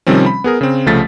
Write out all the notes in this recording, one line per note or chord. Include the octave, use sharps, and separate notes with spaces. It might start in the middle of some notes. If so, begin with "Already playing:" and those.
C3 D#3 F3 G3 C4 C#4
B5
B3 G#4 A#4
C#3 C4
C2 C#3 F3 A3 A6 B6